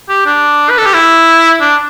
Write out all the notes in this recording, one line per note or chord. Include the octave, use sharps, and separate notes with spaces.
G4
D4
B4
A4
G4
E4
D4